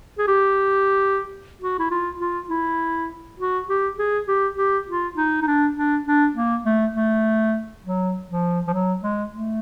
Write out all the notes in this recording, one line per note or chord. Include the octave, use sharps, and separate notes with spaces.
G#4
G4
F#4
E4
F4
F4
E4
F#4
G4
G#4
G4
G4
F4
D#4
D#4
D4
D4
D4
A#3
A3
A3
F#3
F3
F3
F#3
G#3
A3